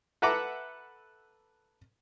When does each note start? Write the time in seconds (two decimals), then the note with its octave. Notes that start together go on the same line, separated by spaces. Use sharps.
0.22 A4 B4 E5 F#5 A#5 D6